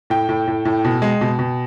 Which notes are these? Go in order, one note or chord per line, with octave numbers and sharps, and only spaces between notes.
A2 G5
A2
A2
A2
B2
G#3
B2
B2